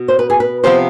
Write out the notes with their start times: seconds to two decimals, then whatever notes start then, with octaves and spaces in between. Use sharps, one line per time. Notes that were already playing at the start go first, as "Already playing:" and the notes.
Already playing: B2
0.08 C5
0.19 B4
0.30 G#4
0.40 B4
0.64 C3 F3 B3 C5